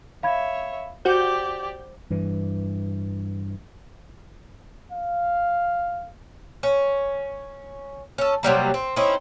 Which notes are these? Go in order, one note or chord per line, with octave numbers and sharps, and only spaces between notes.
C#5 E5 F5 B5 G#6
F#4 G4 C5 D5 G6
G2 E3
F5
C#4
C#4 A4
C3 F#3 G3 A#3
C4
C4 C#4 D#4 E4